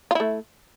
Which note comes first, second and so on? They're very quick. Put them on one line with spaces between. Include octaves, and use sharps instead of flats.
F4 E4 A3